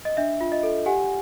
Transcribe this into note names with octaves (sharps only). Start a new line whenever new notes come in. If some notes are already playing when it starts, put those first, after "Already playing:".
D#5
D4 E5
F4
D#5
A4
G4 F#5 G#5